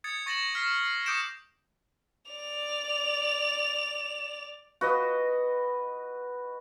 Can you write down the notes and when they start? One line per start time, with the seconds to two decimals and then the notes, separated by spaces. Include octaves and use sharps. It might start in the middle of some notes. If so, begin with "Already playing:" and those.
0.04 D#6 G#6 A6 C#7
0.26 C#6 A6 A#6 C#7 E7 F#7
0.55 F6 B6 C7 E7
0.85 C7
1.06 D6 D#6 G6 C#7 D7 E7
2.31 D5 F7
4.81 F#4 B4 D#5